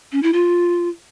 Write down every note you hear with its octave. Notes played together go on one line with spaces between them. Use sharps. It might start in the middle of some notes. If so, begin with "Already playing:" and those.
C#4
E4
F4